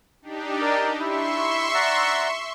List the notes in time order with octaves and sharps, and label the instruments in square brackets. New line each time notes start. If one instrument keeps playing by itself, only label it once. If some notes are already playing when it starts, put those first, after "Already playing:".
[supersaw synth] D4 D#4 G4
[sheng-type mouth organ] A#4 D5
[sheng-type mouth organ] E4 [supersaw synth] E5 C6 C#6
[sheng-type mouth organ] D5 F#5 A#5